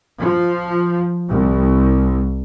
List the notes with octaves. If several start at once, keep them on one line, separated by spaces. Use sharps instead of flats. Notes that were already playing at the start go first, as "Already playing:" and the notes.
F3
C2